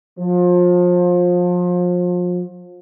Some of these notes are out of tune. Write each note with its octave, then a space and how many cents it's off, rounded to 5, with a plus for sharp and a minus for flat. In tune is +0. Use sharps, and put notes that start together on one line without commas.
F3 +30